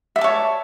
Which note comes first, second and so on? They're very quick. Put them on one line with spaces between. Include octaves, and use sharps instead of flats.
E5 D5 A5 C#5